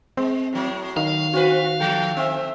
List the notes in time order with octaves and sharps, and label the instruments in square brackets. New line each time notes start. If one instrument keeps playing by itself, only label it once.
[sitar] G#3 [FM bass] C4
[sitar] A2 F#3
[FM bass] D#3 [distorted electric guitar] F5
[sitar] C4 B4 [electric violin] F#4
[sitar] F3 A4 [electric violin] G5
[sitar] C4 [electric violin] E5